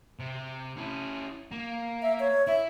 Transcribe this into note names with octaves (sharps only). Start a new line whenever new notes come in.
C3
C#4 E4
A#3
E5
C#5
E4 E5